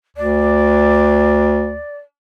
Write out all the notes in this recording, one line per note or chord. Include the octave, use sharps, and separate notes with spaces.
D2 D5